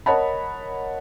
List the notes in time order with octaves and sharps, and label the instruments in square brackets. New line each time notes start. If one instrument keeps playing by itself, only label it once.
[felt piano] A#4 C#5 D#5 F#5 A5 B5